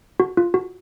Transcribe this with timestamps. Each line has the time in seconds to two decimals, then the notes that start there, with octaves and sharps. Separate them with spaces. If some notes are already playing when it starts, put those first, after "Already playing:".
0.20 F#4
0.37 F4
0.54 F#4